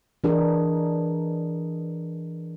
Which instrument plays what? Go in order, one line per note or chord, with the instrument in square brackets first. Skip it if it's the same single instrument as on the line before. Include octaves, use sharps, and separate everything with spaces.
[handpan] E3 D4 G#4 A#4